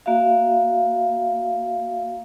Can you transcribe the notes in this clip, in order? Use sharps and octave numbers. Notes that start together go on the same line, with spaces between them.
A#3 F#4 E5 F5